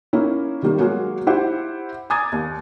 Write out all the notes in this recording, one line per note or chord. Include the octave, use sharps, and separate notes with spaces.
A#3 C#4 D#4 E4
D#3 G3 A#3
F#3 G#3 A#3 F#4 C#5
E4 G4 C5 E5 F#5
G#5 A#5 D6 D#6 G#6 A6
D#2